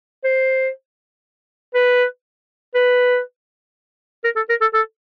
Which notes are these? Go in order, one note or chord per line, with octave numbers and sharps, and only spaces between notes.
C5
B4
B4
A#4
A4
A#4
A4
A4